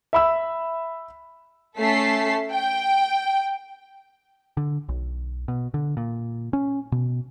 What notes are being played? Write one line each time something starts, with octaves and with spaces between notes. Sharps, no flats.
E5 B5 E6
A3 C#4 A4 A5 B6 C7
G5
D3
B1
B2
D3
A#2
C#4
B2